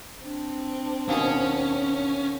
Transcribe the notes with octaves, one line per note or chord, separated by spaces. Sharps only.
C4 D4
D#2 B2 C#4 D#6